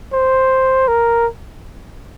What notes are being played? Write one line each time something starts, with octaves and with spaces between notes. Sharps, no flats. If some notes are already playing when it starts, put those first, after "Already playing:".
C5
A#4